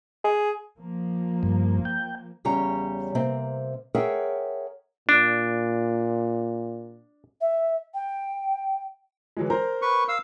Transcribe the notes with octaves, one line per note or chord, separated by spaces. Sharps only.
G#4
F3 A#3
G2
G5
E2 C#3 G3 C#5 A#5
C3 A#3 C4
G#4 A#4 C#5 E5 F#5 G5
A#2 D4
E5
G5
E3 F#3 G#3
A#4 C5 A#5
B4 C#6
F5 E6